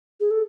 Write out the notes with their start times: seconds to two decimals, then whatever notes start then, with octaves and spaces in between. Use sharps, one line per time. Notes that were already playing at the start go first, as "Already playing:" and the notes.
0.20 G#4
0.31 A4